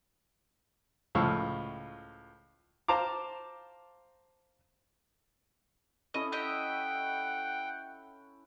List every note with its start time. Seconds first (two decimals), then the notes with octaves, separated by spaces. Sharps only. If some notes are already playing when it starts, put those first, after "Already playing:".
1.15 C#2 A2 F3 F5 C#6 E6
2.88 C5 F5 A5 A#5 D6
6.14 C#4 E4 A4 D#5
6.32 G4 D#5 E5 F#5 G5